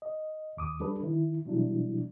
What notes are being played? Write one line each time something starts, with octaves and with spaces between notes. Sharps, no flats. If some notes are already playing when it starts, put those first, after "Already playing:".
D#5
D#2 D6 D#6
G3 D4 A4 B4
D#3 E4
B2 E3 F#3 G3 D4 E4